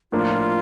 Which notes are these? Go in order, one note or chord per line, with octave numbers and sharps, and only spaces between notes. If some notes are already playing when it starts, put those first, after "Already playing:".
A2 F3 A#3 D4 F4